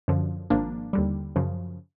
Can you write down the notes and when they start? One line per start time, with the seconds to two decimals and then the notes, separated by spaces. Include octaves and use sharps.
0.08 F#2 D3 F3
0.50 G#1 G#2 F3 A#3 D4
0.93 D#2 D3 G3
1.36 F#2 C#3 F3